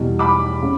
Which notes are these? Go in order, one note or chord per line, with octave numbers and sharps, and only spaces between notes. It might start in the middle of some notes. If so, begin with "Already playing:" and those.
Already playing: E2 B2 G3
B5 D6
C#3